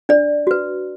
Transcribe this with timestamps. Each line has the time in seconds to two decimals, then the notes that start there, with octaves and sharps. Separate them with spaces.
0.09 D4 D5
0.47 F#4 B4